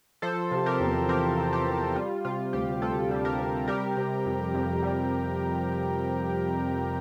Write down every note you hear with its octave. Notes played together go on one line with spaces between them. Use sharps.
F3 A4 C5
C3
G4 A#4
E2
C4 G4 A#4
F3
G4
C3
G3 F4
C3 F4
D2 G4
D2 F4 A4
G3
G4 A#4
C3
G3 G4 A#4
C3
F2
F2
G3